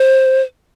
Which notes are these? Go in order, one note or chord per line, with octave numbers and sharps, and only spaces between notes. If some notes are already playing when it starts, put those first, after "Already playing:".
Already playing: C5